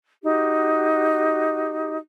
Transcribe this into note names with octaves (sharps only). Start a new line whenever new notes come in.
D#4 F#4 G4